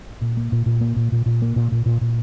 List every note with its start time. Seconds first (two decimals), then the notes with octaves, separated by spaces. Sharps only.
0.22 A#2
0.37 A#3
0.52 A#2
0.66 A#2
0.81 A#3
0.96 A#2
1.12 A#2
1.26 A#2
1.42 A#3
1.56 A#2
1.72 A#2
1.86 A#2
2.01 A#2